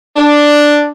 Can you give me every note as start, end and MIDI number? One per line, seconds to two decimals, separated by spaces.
0.17 0.90 62